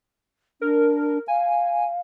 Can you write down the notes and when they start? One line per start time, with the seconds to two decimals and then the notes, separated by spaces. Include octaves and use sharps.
0.61 D4 A#4
1.28 F5 G#5